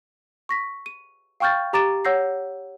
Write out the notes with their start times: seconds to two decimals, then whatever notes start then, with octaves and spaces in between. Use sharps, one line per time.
0.49 C#6 A#6 B6
0.86 D#7
1.40 F5 G5 C#6 F6 G6 A6
1.73 G4 A#5 D6 A6 D7 E7
2.05 C#5 F#5 E6 G6 A#6 C7